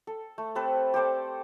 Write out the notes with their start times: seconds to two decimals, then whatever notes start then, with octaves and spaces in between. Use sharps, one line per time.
0.07 A4
0.38 A3
0.55 C4 G4 A4 B4
0.94 G4 A4 C5 D5